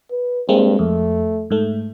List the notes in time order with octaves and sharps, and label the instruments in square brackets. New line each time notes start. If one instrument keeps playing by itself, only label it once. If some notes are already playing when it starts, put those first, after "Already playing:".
[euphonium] B4
[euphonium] G2 [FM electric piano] G#3 A#3 C4
[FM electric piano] F2 [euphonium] A3
[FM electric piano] G#2 A3